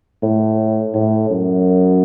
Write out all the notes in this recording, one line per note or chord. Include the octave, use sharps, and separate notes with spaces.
A2
A2
F#2